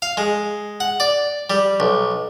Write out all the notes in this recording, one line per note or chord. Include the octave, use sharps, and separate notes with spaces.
F5
G#3
F#5
D5
G3
B1